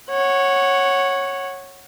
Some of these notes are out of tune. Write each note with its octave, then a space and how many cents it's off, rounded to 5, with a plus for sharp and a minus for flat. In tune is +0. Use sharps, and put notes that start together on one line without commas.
C#5 -10 F#5 +5